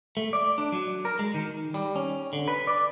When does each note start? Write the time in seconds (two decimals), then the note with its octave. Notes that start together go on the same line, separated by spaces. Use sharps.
0.17 A3
0.33 D5
0.58 D4
0.72 F#3
1.05 A#4
1.19 G#3
1.34 D#3
1.74 G3
1.96 C#4
2.33 D3
2.48 B4
2.67 D5